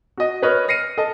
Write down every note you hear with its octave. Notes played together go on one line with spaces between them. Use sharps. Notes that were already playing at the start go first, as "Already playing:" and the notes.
F#4 D#5
B4 C#5 D#5 F6
F6 A#6 C7 C#7 D#7
A4 D#5 A5